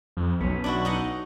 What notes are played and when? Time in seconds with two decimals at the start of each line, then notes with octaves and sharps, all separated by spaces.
0.17 F2
0.41 B1 B3 C#4
0.64 D4 E4 F#4
0.85 D#4 D#5 F#5